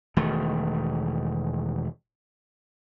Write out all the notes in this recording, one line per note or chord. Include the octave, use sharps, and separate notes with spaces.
E1 D#3 A3